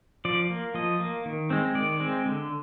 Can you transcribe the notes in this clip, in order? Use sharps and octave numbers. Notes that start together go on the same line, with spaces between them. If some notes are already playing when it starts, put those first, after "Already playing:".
F3 D5
A#3
F3 D#5
A#3
D#3
G#3 C4
D#3 D5
G#3 C4
D3